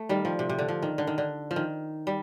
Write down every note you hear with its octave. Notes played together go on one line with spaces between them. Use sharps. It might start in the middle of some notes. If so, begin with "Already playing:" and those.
Already playing: A3
D#3 G3
F3
C3
C3
D3
F3
D#3
D3
D#3
D3
F3
D#3
G3